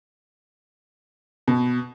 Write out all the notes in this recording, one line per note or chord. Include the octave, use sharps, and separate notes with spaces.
B2